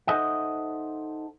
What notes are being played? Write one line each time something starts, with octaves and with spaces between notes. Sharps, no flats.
D#4 A4 C5 D#5 E5 F#5